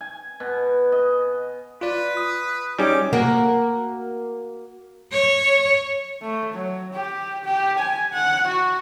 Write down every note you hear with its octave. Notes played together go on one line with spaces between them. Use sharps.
G#5
B2
D#5
F4 B4 D5
D#6
G3 C#4 D#4 G#4 D#5 D6
A#3 F#4 A#4
C#5
A3
F#3
G4
G4
G#5
F#5
F#4